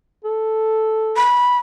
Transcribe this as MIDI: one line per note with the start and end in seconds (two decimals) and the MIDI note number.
0.24 1.20 69
1.17 1.58 83